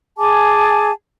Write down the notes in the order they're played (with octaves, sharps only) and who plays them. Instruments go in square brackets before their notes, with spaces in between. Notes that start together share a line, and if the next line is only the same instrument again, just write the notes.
[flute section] G#4 G#5 A5 D6